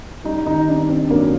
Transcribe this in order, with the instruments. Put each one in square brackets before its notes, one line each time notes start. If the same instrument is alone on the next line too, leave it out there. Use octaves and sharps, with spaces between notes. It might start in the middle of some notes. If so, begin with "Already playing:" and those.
[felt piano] G3 [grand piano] D#4
[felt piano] D#3 [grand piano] D#4
[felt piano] C4 [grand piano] D4
[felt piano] C4 [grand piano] D4
[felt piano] F#2 [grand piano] A#3